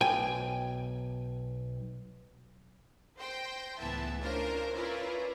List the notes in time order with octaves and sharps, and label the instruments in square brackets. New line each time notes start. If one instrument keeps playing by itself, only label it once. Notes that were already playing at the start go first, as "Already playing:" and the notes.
[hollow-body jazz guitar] B1 G5 G#5
[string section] C5 G5 C6 A#6
C#2 A2 E3 B3 E5 A5
C#4 D4 F4 A#4 C5
C#4 E4 F4 A#4 B4 D5